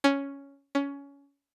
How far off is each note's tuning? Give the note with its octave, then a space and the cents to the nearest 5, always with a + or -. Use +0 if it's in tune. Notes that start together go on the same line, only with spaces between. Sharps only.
C#4 +5
C#4 +20